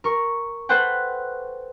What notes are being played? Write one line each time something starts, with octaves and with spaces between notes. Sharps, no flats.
A#4 C#6
A4 B4 C5 F#5 G5